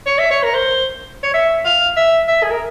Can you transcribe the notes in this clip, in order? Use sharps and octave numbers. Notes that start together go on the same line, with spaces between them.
C#5
E5
C#5
A#4
C5
C#5
E5
F5
E5
E5
G#4
A#4